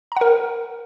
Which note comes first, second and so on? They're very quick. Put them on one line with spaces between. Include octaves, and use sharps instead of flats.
A#5 F#5 A#4